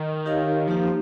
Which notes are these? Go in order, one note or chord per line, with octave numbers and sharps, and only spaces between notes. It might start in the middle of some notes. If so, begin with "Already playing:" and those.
Already playing: D#3
D#4 G4 A#4 C#5 F5
F3 A#3 D#4 G4